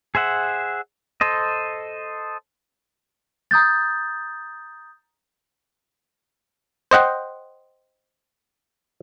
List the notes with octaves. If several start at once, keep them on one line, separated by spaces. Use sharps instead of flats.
G#4 C5 E5 F#5
A4 C5 D#5
A#5 D#6 G6 A6
C5 D#5 F#5 G5